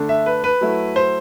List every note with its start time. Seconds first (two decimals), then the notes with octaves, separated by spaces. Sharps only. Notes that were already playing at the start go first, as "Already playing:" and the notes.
Already playing: D3 A3 D4
0.09 E5
0.26 B4
0.44 B4
0.61 F#3 A3 E4
0.96 C5